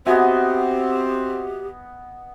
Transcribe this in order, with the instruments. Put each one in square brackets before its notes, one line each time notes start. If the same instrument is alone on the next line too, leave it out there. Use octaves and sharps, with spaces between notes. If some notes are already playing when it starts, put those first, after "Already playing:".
[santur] B3 D#5 G#5 [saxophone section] C4 [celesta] F#4 E5 F#5 [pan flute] G4